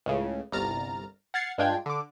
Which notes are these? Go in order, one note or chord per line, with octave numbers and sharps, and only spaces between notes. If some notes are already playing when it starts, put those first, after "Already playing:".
C#2 A2 C#3
G1 C2 A#5 F6 A6
F#5 F6 G#6 A6 C7 C#7
G2 G#3 D4 F4 G5 G#6
D3 D6